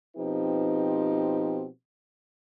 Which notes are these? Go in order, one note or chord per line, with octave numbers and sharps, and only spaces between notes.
B2 F3 C4 D#4 G4 B4